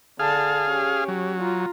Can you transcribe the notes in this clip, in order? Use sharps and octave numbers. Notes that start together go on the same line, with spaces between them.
D3 G#4 F5 A5
C#4 G4
F#3
F4 A#5